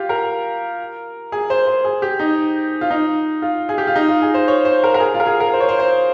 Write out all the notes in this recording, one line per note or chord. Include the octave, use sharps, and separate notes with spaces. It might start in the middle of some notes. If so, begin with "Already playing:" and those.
Already playing: F4 G4
A#4
G#4
C5
C5
G#4
G4
D#4
F4
D#4
F4
G#4
G4
F4
D#4
F4
G#4
C5
C#5
C5
A#4
A#4
G#4
F4
A#4
G#4
A#4
C5
C#5
C5
C5